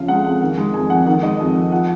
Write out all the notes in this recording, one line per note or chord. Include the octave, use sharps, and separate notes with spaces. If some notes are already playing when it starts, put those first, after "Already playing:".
Already playing: F2 C#3 F3 F5
G#3 F#5
F2 F#5
D#3
G#3
F2 G#5
F2 F#5
D#3 F#5
G#3 D#5
F2
F2
F3 F#5